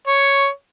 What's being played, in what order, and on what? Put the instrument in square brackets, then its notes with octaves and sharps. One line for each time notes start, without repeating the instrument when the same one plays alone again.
[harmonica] C#5